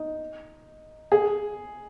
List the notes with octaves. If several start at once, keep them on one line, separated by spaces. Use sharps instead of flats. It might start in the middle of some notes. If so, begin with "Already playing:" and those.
Already playing: D#4
G#4